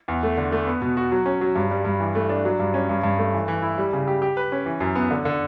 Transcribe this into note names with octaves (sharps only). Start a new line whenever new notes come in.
E2
A3
D3
A3
B3
B2
F#4
F#3
C#4
F#3
G2
G3
G2
E3
A3
D4
F#3
G2
C#4
G2
G2
A3
E3
E3
E4
G3
C#3
G4
G4
B4
C#4
E3
F#2
B3
D3
D3